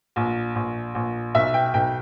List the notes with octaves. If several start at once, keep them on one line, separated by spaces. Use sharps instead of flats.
A#1
A#1
A#1
B1 E5
G5
B1 G5